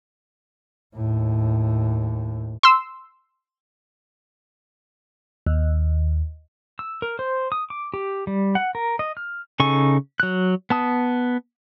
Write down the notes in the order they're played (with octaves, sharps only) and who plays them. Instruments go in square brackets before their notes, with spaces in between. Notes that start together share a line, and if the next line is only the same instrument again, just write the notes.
[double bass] D#2 A2
[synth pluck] C6 E6
[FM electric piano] D#2
[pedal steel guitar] E6
A#4
C5
D#6
D6
G4
G3
F#5
A#4
D#5
F6
C#3 D#4 A4 G#5 C#6
F#3 F#6
B3 A5 D#6